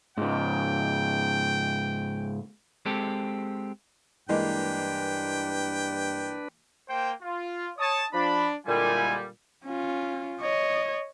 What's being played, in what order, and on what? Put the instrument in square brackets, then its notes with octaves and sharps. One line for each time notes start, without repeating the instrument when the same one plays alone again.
[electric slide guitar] G#2 C#3 [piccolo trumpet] G5
[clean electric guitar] G#3 C4 G4 A4
[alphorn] G2 [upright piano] E3 G#3 A#3 [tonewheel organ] D4 B4 [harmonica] G5
[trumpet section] A#3 C5 G5
F4
[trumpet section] C#5 A5 [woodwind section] D#6
[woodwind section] F3 B5 [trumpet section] D4
[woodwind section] A#2 D3 G3 [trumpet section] G#3 E4 G#5
[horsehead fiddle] C#4 F4
C#5 D#5